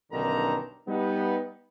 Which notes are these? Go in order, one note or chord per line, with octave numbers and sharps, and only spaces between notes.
B1 G2 D3 D#3 C#4 A#5
G3 B3 D#4